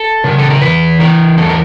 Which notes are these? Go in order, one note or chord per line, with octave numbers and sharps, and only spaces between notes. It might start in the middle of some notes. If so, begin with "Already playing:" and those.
Already playing: A4
C#3 A#4
A4
A#4
E2 B4
E3 A#4
E2 A4
A#4